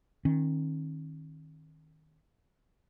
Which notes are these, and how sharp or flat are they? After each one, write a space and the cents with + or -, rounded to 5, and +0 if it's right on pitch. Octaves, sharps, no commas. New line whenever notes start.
D#3 +0 C#4 -40